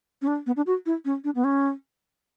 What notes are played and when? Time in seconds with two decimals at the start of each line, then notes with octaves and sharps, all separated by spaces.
0.22 C#4
0.27 D4
0.46 B3
0.57 D4
0.67 F#4
0.86 E4
1.05 C#4
1.24 D4
1.35 B3
1.44 C#4